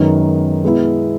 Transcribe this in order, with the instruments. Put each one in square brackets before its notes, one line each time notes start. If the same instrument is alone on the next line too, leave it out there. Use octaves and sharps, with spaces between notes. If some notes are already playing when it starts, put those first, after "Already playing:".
Already playing: [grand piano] F#2 D#3 G#3 B3 D#4
B2 G#3 B3 E4